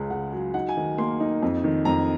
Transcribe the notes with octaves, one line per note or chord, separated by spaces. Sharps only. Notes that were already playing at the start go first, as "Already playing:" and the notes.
Already playing: C#2 C#3 G#3
C#3 F#5
F#3
D#4 F#5
G#5
D#3
A#3 C6
D#4
F2
D#3
F2 A#5